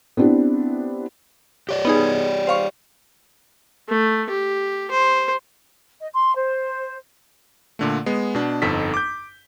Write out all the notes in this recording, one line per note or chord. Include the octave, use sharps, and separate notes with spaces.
B3 C4 D4 E4 G4
G4 C#5 D5
B3 D#4 G#4
C5 F5 C#6
A3
G4
C5
D#5
C6
C5
A#2 D3 A3
G#3 B3
B2 D4
G1 F2 D#4 A4 B6
D6 G6